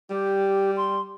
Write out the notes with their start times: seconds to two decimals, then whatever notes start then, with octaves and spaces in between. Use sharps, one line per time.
0.10 G3 G4
0.77 C6